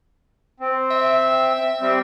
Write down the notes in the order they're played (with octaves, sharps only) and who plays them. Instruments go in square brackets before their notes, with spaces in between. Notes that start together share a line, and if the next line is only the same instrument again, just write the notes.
[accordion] C4
[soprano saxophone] E5
[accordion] G3 C4